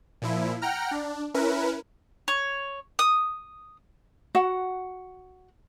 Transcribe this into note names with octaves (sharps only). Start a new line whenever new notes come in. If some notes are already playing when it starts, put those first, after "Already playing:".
A#2 F3 E4
F#5 G5 A#5 F6
D4
C#4 E4 A#4 B4
C#5
D#6
F#4 F#5